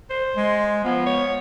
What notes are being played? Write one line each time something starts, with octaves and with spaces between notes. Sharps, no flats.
C5
G#3
F3 B3
C#5